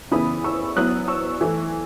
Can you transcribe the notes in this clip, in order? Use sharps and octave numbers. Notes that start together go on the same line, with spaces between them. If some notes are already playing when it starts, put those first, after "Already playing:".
C#3 E3 B3 E4 B5 D#6
C#6 E6
F#3 B3 E4 D#6 F#6
C#6 E6
E3 A3 E4